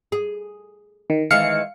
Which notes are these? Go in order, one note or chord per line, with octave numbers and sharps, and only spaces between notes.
G#4
D#3
D#3 E3 G#3 F5 C#7